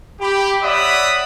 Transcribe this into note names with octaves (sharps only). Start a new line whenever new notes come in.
G4 B5
C#5 D5 E5 F#5 B5 D#6